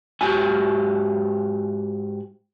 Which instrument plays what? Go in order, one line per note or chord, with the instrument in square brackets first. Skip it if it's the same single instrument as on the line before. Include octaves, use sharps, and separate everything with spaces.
[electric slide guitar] G#2 F#4 G4 G#5